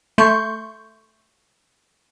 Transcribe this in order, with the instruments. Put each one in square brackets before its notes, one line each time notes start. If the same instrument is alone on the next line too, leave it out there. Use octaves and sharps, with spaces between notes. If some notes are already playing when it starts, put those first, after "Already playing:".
[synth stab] A3 C6 C#6 G6